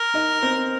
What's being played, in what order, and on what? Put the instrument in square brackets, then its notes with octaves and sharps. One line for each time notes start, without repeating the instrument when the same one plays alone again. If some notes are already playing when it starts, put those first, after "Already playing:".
Already playing: [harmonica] A#4
[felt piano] D#4 D#5
C4 C5